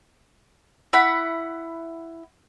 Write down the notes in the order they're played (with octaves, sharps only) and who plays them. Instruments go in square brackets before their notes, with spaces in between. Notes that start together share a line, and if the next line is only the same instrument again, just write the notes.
[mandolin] E4 F#5 B5